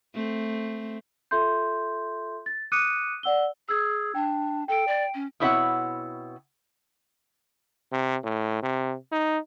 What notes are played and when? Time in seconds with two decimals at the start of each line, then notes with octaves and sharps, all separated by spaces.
0.14 A3 C4
1.31 F4 A4 E5 C6 G6
2.46 A6
2.72 D6 D#6 F#6 C#7 D#7
3.23 D5 F#5 E6 G7
3.69 G#4 E6 G#6
4.15 D4 G5
4.68 A4 G5 D7
4.87 D5
5.14 C#4
5.40 B2 C4 E4 C#5 F5 F#5
7.92 C3
8.23 A2
8.63 C3
9.12 D#4